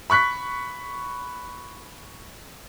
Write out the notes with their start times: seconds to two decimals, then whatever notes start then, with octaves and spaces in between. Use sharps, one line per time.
0.10 B5 C#6 F#6 B6